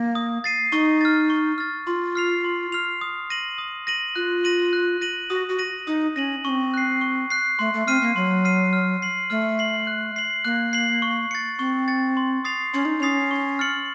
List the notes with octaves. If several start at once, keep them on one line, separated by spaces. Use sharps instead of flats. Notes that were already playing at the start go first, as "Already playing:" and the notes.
Already playing: A#3
D#6
A6 C7 D#7
D#4 C#6
F6 A6
C#6
F6 A6
F4 C6
F6 C7 F7
C6
F6 C7 F7
D#6
A#6 D#7 F#7
D#6
A#6 D#7 F#7
F4 F#6
A#6 D#7 F#7
F#6
A#6 D#7 F#7
F#4 D#6
F#4
A#6 D#7 F#7
D#4 D#6
C#4 A#6 D#7 F#7
C4 C#4 C#6
F#6 C7
C#6
F#6 C7
A3 C6
A3
C4 F6 C7 D#7
A#3
F#3 C6
F6 C7 D#7
F6
C7 F#7
A3 F6
C7 F#7
F#6
C7 F#7
A#3 F#6
C7 F#7
C#6
A6 C#7
C4 C#6
A6 C#7
C6
D#6 A6 C7 F7
C#4 C6
D#4
D#4
C#4 D#6 A6 C7 F7
C#6
F6 A6 C#7 F#7